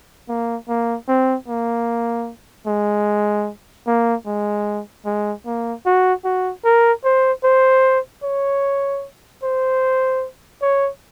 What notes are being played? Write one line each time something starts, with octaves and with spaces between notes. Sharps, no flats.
A#3
A#3
C4
A#3
G#3
A#3
G#3
G#3
A#3
F#4
F#4
A#4
C5
C5
C#5
C5
C#5